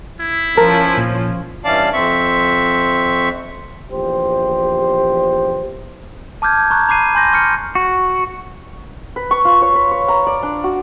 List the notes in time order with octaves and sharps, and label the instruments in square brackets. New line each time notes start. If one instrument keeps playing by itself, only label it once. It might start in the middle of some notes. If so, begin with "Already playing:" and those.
[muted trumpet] E4
[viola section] F3 C#4 [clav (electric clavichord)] A#4 [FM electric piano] A5
[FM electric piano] A#2
[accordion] G2 E3 C#4 D5 F5 A5
F2 C4 E5 C#6
[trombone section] A#1 E2 G4 C5
[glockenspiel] A5 D6 F6 G6 G#6
A#5 C#6 F#6
A#5 B5 D6 F#6 C7 D#7
G#5 C6 G6 A#6
C#6 F6 C#7
[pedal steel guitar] F#4
[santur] B4
C#6
F4
C#5
B4
C#5
A#5
D5
D4
F#4